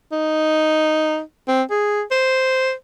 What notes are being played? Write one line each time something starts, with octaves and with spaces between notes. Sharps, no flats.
D#4
C4
G#4
C5